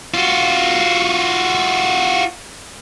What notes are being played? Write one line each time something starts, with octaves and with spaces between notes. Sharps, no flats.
F4 F#4